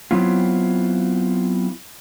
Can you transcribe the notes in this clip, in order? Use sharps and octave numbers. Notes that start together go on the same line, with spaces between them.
F#3 B3 C4 E4 F4